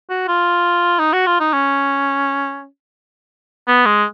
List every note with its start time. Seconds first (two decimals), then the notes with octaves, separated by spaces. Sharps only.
0.10 F#4
0.28 F4
0.99 D#4
1.13 F#4
1.27 F4
1.40 D#4
1.54 C#4
3.68 B3
3.86 G#3